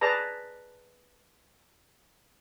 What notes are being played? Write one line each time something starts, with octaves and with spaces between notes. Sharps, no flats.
G#4 B4 D5 A5 A#5